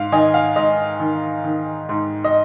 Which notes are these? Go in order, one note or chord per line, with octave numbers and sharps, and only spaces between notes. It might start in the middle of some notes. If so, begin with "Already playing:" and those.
Already playing: G#2 F5
D#3 D#5 G#5
F5
G#2 D#5
D#3
D#3
G#2
D#5